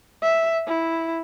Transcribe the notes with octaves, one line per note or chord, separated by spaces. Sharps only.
E5
E4